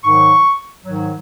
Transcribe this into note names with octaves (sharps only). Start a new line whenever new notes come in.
G#2 D#3 F#3 C#6
G#2 D#3 F#3